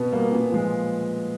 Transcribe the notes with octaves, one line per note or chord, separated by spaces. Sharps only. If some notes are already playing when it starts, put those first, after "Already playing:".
Already playing: B2 B3
G3 A#3
A#2 B3
F3 G#3